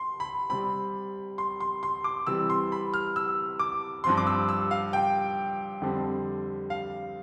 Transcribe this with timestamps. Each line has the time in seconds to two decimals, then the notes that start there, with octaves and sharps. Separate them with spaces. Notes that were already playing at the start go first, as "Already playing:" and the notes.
Already playing: C6
0.20 B5
0.50 C3 G3 C4 B5
1.38 C6
1.60 C6
1.83 C6
2.04 D6
2.27 C3 E3 G3 E6
2.50 C6
2.72 B5
2.94 F6
3.16 E6
3.59 D6
4.04 G2 F3 C4 C6
4.17 D6
4.27 E6
4.49 E6
4.71 F5
4.93 G5
5.82 F2 D3 G3 C4
6.70 F5